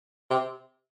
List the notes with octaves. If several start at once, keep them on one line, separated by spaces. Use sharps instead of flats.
C3